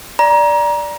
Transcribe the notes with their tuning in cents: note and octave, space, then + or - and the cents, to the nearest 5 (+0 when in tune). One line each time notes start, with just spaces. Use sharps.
D5 +0 A#5 +25